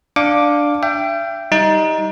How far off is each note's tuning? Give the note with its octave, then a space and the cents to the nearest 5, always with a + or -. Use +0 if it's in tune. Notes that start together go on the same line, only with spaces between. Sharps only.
D4 +5 F5 +10 D6 +0
E5 +40 G5 -5
G3 +0 D#4 +15